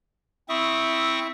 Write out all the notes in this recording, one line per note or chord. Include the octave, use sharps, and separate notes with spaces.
C4 E4 E5 C#6 D#6